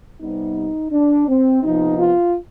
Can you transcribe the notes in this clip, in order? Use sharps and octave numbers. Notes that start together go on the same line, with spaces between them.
C3 G3 B3 D#4
D4
C4
C3 F3 B3 D#4
F4